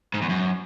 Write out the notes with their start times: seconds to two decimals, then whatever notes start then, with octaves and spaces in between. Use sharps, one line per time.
0.14 G#2
0.22 E2
0.29 F#2